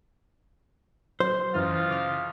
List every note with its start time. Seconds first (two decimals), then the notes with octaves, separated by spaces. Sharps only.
1.20 F#3 C5
1.54 C2 F#2 E3 D#4 F4 F6
1.89 C#3 D6 F6